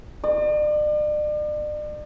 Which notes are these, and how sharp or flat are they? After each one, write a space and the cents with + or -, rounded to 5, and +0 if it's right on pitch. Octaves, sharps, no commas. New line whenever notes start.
D5 +40